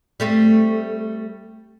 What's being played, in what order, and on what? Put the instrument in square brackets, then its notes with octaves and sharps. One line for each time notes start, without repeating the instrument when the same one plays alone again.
[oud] G3 A3 C4